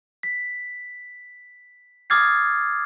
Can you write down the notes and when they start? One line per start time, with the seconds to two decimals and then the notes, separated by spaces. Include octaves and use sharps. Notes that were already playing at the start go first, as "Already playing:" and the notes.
0.23 B6
2.10 D6 D#6 F6 G#6 A6 C7